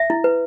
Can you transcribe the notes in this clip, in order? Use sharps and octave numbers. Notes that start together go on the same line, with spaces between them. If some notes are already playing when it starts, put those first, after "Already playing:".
Already playing: E5
E4
B4